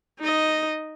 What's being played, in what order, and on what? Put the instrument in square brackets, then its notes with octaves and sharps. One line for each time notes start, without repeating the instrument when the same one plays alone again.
[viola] D#4 D#5